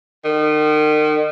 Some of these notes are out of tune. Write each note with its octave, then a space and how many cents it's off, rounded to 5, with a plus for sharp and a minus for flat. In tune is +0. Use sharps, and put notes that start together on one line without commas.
D#3 -35